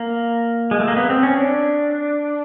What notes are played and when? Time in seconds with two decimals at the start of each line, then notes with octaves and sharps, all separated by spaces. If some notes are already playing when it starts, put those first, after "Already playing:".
Already playing: A#3
0.71 G#3
0.80 A3
0.88 A#3
0.96 B3
1.10 C4
1.23 C#4
1.37 D4